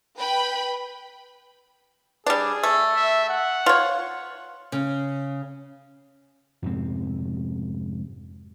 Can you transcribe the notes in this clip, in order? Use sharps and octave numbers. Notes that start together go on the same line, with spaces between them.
B4 G5 B5
G3 D4 G#4
A3
E5
F#5
F4 C#5
C#3
F2 G#2 C3 C4